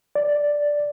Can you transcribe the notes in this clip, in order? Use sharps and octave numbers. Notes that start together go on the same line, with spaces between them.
D5